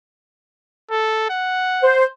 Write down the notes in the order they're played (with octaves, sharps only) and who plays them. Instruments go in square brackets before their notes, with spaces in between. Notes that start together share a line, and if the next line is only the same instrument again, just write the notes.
[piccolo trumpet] A4
F#5
[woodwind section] C5